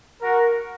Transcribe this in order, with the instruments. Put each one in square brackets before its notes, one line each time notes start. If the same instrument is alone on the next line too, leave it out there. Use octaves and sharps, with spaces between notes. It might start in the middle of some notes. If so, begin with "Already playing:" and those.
[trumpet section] F#4 A#4